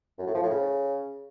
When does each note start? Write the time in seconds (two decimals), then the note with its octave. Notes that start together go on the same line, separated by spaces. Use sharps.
0.19 F#2
0.27 A2
0.35 F3
0.43 A2
0.50 C#3